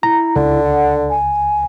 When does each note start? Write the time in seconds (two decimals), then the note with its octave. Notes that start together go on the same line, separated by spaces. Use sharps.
0.03 E4 A#5
0.36 C#2 D3
0.63 F#5
1.10 G#5